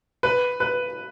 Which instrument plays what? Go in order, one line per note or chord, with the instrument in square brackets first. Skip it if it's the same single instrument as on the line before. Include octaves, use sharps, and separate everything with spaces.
[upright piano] B4
B4